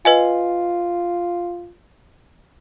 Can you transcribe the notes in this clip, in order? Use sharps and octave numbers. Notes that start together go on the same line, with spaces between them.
F4 B4 D#5 G#5